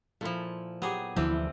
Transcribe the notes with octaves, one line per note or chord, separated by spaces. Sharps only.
A#2 F3 E4 F4 A4
F#3 B3 G4 G#4
D2 D3 E3 F3 G3 C4 E4